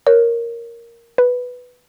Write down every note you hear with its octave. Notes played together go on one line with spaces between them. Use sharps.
A#4 C#5
B4